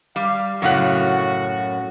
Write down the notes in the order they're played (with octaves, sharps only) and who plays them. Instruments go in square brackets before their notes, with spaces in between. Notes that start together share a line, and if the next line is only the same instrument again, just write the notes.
[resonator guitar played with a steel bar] G3 [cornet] F5
[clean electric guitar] F#2 A2 [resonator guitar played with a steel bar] C#3 F5 F#5 [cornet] F#4